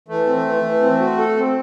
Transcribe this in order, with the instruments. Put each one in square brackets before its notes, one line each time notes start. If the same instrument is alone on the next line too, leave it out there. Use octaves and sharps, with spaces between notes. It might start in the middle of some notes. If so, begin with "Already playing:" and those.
[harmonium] E3 [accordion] A3
[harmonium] C4
E3
E3
C4
F#4
A4
C4